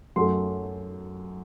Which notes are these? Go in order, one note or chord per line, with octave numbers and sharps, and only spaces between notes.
F#2 F#3 A3 C6